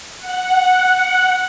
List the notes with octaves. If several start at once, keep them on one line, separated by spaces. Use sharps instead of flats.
F#5